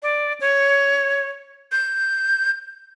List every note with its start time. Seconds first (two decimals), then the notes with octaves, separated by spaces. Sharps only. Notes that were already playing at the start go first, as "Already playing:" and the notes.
0.03 D5
0.41 C#5
1.72 G6